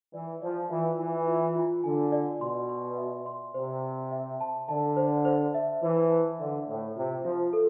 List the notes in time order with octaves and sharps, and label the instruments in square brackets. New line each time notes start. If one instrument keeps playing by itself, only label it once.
[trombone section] E3 [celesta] D5
[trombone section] F3 [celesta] D5
[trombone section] E3 [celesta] F4
[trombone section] E3 [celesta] G#5
[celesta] F4
F4
[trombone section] D3 [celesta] G#5
[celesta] D5
[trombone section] B2 [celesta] C6
[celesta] C6
E5
C6
[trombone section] C3 [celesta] C5
[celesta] C5
E5
A5
[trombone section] D3 [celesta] A5
[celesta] C5
C5
E5
[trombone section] E3 [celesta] C5
[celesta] A5
[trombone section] D3 [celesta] E5
[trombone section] A2 [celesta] C5
[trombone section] C3 [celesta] F4
[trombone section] F3 [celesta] F4
[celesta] A4